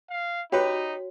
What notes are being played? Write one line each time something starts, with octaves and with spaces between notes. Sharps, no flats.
F5
D#4 F#4 G4 B4 C#5